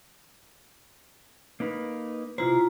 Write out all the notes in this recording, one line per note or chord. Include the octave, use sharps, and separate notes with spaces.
A#3 D#4 B4
C3 E4 F4 C5 A#5